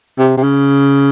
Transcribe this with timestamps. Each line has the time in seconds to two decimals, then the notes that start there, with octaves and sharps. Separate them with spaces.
0.19 C3
0.37 C3
0.43 C#3